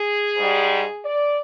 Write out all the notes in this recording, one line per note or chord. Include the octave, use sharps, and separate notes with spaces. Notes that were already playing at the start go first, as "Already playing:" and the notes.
Already playing: G#4
G#2 G3
D5